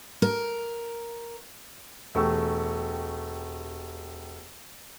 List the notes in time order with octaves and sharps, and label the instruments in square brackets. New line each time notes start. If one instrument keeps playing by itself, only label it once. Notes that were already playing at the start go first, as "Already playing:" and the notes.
[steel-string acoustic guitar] A#4
[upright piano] E1 A3 G4 C#6 E6